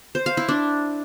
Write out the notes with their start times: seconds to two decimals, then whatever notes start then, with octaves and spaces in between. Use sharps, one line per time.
0.15 C5
0.26 F5
0.37 E4
0.49 D4